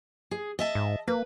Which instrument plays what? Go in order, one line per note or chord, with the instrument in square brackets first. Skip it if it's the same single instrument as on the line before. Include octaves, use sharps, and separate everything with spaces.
[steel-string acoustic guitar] G#4
D#5 E5 A5
[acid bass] G#2
[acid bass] A#3 [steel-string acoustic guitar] B4